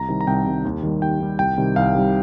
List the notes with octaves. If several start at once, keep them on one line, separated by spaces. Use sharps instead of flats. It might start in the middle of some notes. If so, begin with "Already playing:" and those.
Already playing: C2 A#5
C3 D#3 G3
A#5
C2 G5
C3 D#3 G3
D#2
D#3 G3
D#2 G5
D#3 G3
C2 G5
C3 D#3 G3
C2 F5
C3 D#3 G3